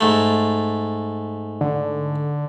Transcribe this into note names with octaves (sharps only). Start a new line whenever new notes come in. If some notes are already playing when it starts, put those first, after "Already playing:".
G#2 A3
D3